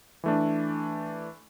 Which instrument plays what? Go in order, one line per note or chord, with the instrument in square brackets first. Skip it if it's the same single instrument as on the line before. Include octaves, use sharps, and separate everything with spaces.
[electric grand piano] E3 A3 D4